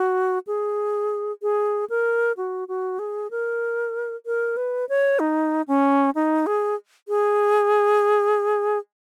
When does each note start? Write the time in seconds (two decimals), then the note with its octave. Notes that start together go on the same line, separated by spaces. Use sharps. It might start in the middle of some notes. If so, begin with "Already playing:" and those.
Already playing: F#4
0.47 G#4
1.42 G#4
1.90 A#4
2.37 F#4
2.68 F#4
2.99 G#4
3.31 A#4
4.26 A#4
4.57 B4
4.89 C#5
5.19 D#4
5.68 C#4
6.15 D#4
6.46 G#4
7.08 G#4